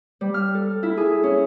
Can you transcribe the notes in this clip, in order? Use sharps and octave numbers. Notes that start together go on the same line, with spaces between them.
G3
F6
A4
E4
G#4
C#4